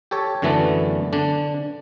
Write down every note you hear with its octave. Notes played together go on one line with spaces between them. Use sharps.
G4 A4 C#5
F#2 D3 E3 A3 B3 D4
D3 D4